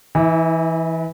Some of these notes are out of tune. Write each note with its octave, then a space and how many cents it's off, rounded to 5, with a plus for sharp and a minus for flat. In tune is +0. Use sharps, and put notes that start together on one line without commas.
E3 +0 E4 -40